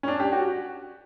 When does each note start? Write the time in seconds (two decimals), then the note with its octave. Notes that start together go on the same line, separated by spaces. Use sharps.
0.03 C#4
0.08 D4
0.20 G4
0.32 F#4